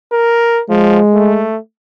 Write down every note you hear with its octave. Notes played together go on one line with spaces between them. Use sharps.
A#4
F3 G#3
A3